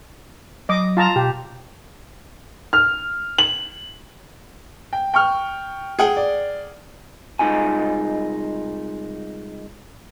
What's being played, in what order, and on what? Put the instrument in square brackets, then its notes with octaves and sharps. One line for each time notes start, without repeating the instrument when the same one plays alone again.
[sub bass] F#3 [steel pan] D#5 D6
[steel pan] F4 A5 A#5
[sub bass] B2 [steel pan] G4
[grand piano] F6
F#7
[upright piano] G5
G5 C#6 F6
[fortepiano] G#4 F#5 G5
[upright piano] D5
[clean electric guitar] C2 F#3 G#3 D#4 F4 G#5